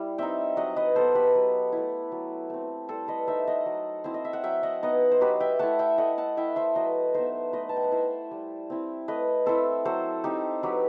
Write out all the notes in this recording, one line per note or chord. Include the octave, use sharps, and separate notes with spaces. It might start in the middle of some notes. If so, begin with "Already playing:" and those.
Already playing: G3 E4
C4 D#4 E5 G5
F#3 D#5 F#5
B4 D#5
B3 D#4 A4 C5
G4 B4
F#3
A3 E4
F#3
A3 C4
G3 A4 C5
B4 D#5
D#4 C5 E5
D#5 F#5
F#3
C4 E4 C5
D#5
E5
F#5
F#3 E5 G5
D#5 F#5
B3 D#4 D#5 F#5
C5
F#3 G4 B4
E5 G5
A3 E4 F#5 A5
E5 G5
A3 D#5 F#5
F#5 A5
E4 E5 G5
C5 E5
F#3 B4 D#5
B3 D#4 C5 E5
A3 B4 D#5
A5
G5
F#5
E4 C5 E5
G3
C4 E4
A3 B4 D#5
C4 E4 A4 C5
F#3 A4 C5
C4 D#4 G4
F#3 G4 B4